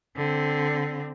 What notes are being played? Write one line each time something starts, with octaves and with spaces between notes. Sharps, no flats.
D3 C4